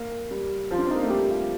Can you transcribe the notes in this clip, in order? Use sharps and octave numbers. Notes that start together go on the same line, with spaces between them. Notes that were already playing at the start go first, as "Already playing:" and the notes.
Already playing: A#3
G3
F3 F4
D4
C4
A#3 D#4
A3
G3 G4
F4